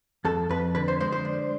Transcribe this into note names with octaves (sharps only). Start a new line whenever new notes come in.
F2 A4
F2 B4
D3 B4
C5
G#3 C5
C5
D4